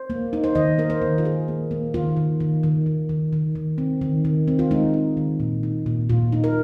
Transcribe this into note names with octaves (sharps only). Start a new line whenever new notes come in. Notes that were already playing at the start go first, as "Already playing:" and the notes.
Already playing: C5
A#3
D#4
C5
D#3 D#5
A#3 A#4
C5
D#3
F4
D#3 G#4
A#3
A#3
D#3 F4
D#3
D#3
D#3
D#3
D#3
D#3
D#3
C4
D#3
D#3
C4
F4
G#3 D#4
C4
D#3
A#2
D#4
A#2
A#2 F4
D#4
A#4